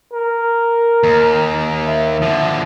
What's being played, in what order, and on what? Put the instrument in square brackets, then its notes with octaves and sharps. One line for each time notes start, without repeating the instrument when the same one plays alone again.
[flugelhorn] A#4
[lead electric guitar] D#2
[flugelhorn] E5
[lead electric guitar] D3 F3